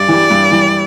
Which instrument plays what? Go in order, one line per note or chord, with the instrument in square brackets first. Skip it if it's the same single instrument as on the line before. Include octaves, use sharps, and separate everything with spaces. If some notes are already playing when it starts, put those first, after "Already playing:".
Already playing: [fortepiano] G2 [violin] D5
[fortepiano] E3 G3
G2
E3 G3